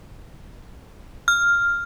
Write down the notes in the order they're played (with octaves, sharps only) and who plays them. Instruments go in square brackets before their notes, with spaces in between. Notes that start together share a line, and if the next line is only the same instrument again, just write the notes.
[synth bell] F6